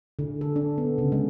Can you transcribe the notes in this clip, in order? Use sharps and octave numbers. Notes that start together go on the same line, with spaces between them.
D3
A4
D4
B3
C#3
G#3